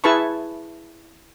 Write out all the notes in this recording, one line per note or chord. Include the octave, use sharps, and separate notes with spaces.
E4 G#4 B4 A5 B5 C#6